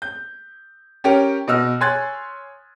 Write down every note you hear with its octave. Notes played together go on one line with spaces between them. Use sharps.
G6
C#4 G4 A#4 C#5 G5
B2 D#5 E6 F6
C#5 G#5 C6 F#6 G#6 A6